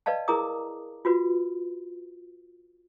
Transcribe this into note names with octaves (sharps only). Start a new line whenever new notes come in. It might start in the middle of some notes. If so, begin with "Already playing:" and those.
B4 D5 D#5 F5 A5
E4 G#4 A#4 A#5 D6 D#6
F4 F#4 B4